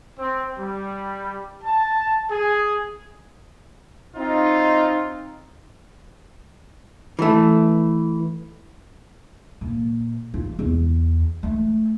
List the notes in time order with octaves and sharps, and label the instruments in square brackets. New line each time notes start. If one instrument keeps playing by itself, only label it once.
[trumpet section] C4
G3
A5
G#4
[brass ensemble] C4 D#4 F4
[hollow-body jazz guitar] E3 A3
[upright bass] A#2
F4
E2
A3